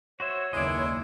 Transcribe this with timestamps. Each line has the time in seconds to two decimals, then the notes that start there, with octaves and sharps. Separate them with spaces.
0.20 F#4 C5 C#5 E5
0.53 F#1 D#2 G#3 A#3 B3 E4 D5 D#5